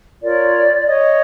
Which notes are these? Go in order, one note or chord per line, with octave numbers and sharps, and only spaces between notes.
F4 A#4 C#5 D5
C#5 D#5